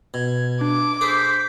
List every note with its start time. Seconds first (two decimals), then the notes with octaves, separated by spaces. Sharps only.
0.14 B2 G#6
0.61 D4 D6
1.01 G#4 A4 C5 B6